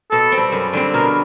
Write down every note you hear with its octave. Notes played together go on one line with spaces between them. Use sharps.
B2 A4
C4
G3
F#2
D3 G3 C4
B2 A#4